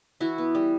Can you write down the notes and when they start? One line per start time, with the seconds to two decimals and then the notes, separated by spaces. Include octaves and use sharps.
0.20 E3 E4 F#4
0.38 B3
0.55 G3